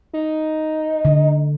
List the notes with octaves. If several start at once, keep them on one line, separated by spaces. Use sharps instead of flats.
D#4
D3